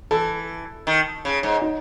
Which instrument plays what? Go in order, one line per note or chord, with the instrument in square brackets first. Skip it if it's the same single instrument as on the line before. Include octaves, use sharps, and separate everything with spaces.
[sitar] E3 [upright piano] A4
[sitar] D#3
C#3
G#2
[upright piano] D#4